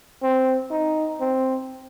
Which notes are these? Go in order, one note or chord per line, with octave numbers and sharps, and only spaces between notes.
C4
D#4
C4